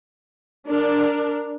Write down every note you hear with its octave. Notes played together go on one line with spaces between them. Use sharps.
D4 A#4